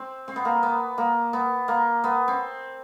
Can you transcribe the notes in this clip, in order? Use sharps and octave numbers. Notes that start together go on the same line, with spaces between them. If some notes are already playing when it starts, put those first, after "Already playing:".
Already playing: C4
C4
B3
A#3
B3
A#3
B3
A#3
B3
C4